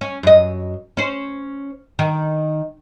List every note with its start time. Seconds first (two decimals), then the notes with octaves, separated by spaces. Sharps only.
0.01 C#4
0.23 F#2 D#5
0.97 C#4 C5
1.99 D#3